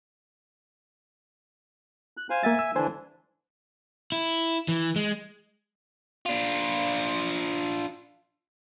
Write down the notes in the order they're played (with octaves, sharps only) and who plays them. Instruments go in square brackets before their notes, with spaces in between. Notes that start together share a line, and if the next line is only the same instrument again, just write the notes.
[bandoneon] F#6
C5 F5 G#5
[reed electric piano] A#3 F5 A6 [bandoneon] E5 G#5
[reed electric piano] E6
[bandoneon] D3 E3 D4 [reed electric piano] C5 G#5
[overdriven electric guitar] E4
E3
G#3
D4 F4